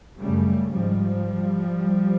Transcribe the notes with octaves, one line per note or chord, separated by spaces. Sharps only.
F#2 C#3 G3 A3
G#2 F3 G3